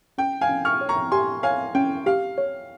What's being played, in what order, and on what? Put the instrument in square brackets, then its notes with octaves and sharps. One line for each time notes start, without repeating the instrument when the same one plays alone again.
[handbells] C#4 [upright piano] G5
[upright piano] F5 G#5
[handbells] C#4
[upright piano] C#6 F6
[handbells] C#5
[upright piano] A#5 C#6
[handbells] G4 [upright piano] G#5 C6
[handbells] C#5 [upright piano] F5 G#5
[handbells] C#4 [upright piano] G5
[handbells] G4 [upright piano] F5
[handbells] C#5